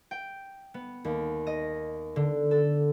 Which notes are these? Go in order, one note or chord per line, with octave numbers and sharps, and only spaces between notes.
G5
B3
D#2
D#5
D3
A4